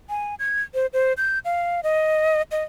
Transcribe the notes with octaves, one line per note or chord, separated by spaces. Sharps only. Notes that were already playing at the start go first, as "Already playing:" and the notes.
G#5
G#6
C5
C5
G6
F5
D#5
D#5